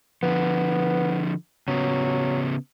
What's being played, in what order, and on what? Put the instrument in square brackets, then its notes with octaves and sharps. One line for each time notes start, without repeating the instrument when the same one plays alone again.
[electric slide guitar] D3 F3 [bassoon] B3
[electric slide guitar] C#3 B3 [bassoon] F#3